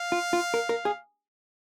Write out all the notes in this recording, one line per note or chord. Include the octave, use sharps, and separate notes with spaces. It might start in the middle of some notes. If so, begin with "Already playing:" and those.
Already playing: F5
F4
F4
A#4
A#4
G#4